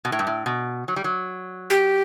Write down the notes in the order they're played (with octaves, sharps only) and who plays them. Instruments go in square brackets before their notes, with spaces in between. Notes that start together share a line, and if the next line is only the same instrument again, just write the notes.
[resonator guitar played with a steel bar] B2
A2
G2
A2
B2
F#3
G3
F#3
[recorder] G4